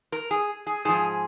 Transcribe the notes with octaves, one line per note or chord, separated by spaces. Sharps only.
A#4
G#4
G#4
G#2 F3 G#4